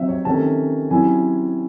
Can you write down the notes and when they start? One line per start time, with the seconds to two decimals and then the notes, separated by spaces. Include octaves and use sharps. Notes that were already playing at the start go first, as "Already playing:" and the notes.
Already playing: C3 F#3 C4 D#4 E5
0.08 C#5
0.25 C3 D#3 A3 C#4 A5
0.91 C3 F#3 C#4 E4 G#5